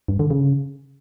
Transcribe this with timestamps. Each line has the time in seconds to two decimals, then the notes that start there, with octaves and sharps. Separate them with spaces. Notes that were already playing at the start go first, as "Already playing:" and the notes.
0.08 G2
0.19 D3
0.30 C#3